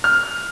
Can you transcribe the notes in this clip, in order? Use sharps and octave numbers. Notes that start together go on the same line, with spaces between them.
F6